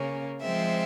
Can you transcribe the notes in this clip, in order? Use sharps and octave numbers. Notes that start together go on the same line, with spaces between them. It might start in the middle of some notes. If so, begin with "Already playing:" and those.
Already playing: C#3 A#3 C#4
F3 G#3 C4 E5